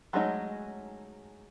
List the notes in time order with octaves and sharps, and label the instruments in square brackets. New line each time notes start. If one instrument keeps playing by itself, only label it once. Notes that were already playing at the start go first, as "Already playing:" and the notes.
[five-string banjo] F#3 G#3 A3 C#4 D#4